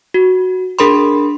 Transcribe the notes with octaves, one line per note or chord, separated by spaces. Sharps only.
F#4
D4 G#4 A#4 B5 C6